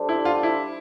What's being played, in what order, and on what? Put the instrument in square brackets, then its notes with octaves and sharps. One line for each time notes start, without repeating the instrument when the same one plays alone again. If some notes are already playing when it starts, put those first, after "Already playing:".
Already playing: [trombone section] G3 D4 A4 C5
[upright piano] E4
F4
E4